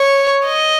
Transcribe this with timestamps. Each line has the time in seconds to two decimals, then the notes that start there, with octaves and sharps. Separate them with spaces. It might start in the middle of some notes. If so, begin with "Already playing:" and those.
Already playing: C#5
0.46 D#5